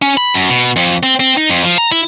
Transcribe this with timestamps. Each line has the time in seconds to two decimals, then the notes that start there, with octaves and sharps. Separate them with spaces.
0.02 C#4
0.18 B5
0.34 F#2
0.50 B2
0.76 F2
1.03 C4
1.20 C4
1.37 D#4
1.49 F2
1.64 F3
1.78 A#5
1.92 E4